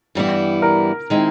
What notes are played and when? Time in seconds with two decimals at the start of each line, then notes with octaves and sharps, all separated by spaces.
0.15 G2 E3 G3 B3 E4
0.62 A#4
1.10 D#3 G#3 C4 E4